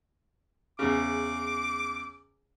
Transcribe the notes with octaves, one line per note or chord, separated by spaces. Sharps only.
E2 C#3 D6